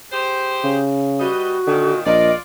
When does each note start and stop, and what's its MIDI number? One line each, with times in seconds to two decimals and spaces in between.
0.12 0.82 67
0.12 0.82 68
0.12 0.82 72
0.64 1.28 49
1.20 1.57 55
1.20 1.99 66
1.20 1.57 71
1.20 1.57 75
1.67 2.02 46
1.67 1.93 50
1.67 2.02 51
2.06 2.32 34
2.06 2.37 65
2.06 2.37 74
2.06 2.31 75